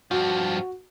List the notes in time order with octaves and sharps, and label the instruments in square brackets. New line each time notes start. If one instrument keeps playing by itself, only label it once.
[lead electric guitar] G2 F3 [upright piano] F#4